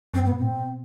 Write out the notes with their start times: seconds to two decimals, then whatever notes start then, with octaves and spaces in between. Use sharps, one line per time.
0.14 F#2 C4
0.23 G2 B3
0.32 B2
0.39 A2 C4
0.50 B2